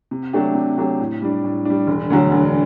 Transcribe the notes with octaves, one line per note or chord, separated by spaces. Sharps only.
C3
F#3 A3 D4 G4
C3
F#3 A3 D4 G4
A2
G3 D4
A2
G3 D4
E1
D2 D3 F#3
E1